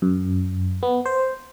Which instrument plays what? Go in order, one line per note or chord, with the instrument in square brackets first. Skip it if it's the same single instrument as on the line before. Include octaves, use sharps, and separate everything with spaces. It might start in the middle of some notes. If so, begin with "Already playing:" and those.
[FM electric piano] F#2
B3
C5